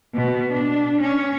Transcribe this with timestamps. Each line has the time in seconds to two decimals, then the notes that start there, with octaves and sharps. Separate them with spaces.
0.14 B2
0.53 D4
1.03 C#4